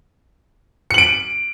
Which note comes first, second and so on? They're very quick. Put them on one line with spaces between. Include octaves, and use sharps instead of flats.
C#7 F#7 D7